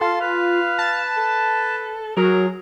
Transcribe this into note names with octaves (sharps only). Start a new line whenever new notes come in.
F4 A4 C6
B4 F5
A5
A4
F#3 G#4 A#4